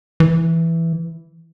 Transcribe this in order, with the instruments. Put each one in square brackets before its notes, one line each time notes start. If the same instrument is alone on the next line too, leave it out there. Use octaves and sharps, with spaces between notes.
[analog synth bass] E3